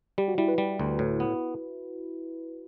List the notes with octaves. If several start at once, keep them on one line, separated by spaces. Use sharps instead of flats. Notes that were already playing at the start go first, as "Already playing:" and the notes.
G3 G4
F#4
G3 E4
B4
G3
D2
A2
B3